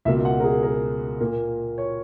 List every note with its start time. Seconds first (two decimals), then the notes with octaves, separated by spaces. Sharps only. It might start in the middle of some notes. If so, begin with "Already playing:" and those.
0.05 C#2 B2 A#3 E5
0.25 F#5
0.40 A#4
0.44 G#4
0.63 A#4
1.20 A#2 A#3
1.78 C#5